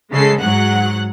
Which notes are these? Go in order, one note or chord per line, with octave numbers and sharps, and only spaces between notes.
C#3 G#3 A4 C7
G#2 F#3 F#5 F#6